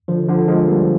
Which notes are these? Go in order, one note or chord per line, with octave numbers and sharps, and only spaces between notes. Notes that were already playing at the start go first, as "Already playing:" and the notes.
D3 F3
D3 F3
F3 G#3
G3 A#3